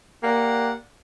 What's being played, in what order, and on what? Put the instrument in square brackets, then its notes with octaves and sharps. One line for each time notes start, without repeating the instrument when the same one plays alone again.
[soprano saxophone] A#3 [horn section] G4 D5 F#5